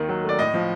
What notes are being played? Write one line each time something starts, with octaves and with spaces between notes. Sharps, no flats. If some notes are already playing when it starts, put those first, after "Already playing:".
Already playing: D#2 D#3
F#3
A3 D5
A2 D#5
F3